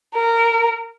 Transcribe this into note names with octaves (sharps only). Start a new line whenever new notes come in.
A#4